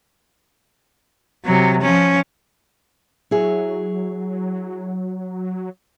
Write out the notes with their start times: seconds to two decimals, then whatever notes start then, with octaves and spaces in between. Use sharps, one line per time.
1.45 C3 F#3
1.81 F3 C#4
3.31 F#3 E4 G#4 C#5